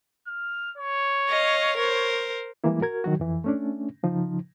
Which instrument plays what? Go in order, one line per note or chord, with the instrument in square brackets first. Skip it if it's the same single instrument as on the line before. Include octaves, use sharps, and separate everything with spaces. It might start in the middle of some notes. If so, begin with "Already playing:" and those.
[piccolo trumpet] F6
C#5
[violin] D#5 F5
A#4 C5
[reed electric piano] E3 G3 G#3 A#3 E4
F#4 A#4 G#6
D#3 F#3 F#4
F2 E3
A3 C#4 D4
C#3 F3 D#4